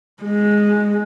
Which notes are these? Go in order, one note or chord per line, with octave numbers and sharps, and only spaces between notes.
G#3